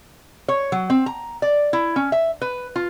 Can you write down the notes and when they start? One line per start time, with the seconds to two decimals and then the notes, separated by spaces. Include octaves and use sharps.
0.48 C#5
0.72 F#3
0.90 C4
1.06 A#5
1.42 D5
1.73 E4
1.96 C#4
2.12 E5
2.41 B4
2.76 F4